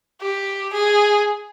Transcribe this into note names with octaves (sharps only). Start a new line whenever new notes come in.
G4
G#4